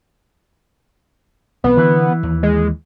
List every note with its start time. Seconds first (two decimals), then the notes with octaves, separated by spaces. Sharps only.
1.64 B1 E3 B3 C4
1.77 D3 E3
2.23 D#2
2.43 G#3